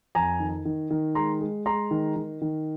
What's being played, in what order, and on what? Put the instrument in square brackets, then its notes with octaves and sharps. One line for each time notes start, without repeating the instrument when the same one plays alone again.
[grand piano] F2 G#5 A#5
D#3
D#3
D#3
G#3 A#5 C6
G#3
G#3 A#5 C6
D#3
D#3
D#3